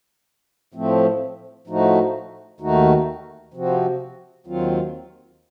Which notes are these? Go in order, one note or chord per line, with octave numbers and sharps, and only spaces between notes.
A2 F3 A3 C4
A2 F3 A3 D#4 F#4
D#2 D#3 A3 D#4 F#4
C3 F3 C4 F#4
D#2 D#3 F#3 C4 F4